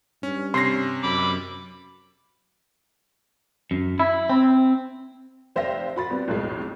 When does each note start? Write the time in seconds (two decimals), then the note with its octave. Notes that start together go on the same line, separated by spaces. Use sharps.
0.23 G2 C#4
0.54 C3 C#4 C6 A#6
1.03 F#2 B5 D6
3.71 F#2
4.00 E4
4.29 C4
5.56 F1 C5 E5 F5 G5 A#6
5.96 F#4 B5 A6
6.10 G2 B3 C4
6.28 B1 F2 A2 G#3